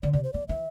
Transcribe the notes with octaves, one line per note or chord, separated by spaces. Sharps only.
D3 D5
C3 D5
C5
F3 D5
E3 E5